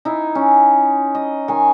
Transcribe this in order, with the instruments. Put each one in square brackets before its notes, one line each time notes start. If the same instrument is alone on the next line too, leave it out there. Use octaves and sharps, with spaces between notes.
[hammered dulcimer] D#4 E4
C#4
D#5
D#3 G#5